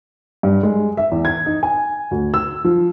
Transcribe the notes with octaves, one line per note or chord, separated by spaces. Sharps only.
G2
G#3
E5
E2
G#6
D#4
G#5
D2
E6
F3